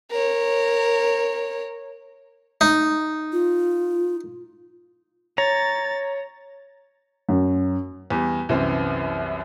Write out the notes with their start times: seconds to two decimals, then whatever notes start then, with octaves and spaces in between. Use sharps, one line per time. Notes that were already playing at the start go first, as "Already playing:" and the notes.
0.11 A#4 C#5
2.61 D#4
3.33 F4
5.38 C#5 A#5 A6
7.29 F#2
8.10 E2 G3
8.49 C2 F#2 E3 C4